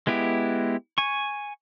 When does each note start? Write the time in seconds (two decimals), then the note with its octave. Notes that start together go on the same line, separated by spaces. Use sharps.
0.07 G#3 B3 E4 G4
0.98 G#5 C#6